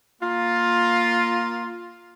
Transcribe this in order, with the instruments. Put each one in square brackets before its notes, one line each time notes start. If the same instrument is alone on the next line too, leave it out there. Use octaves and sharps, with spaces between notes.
[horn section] A#3 F4